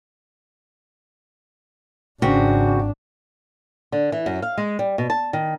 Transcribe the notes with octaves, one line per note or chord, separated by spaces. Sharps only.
G#1 C#3 C4 D4 F#4
D3
E3
F#2
F5
G#3
G3
B2
A5
D#3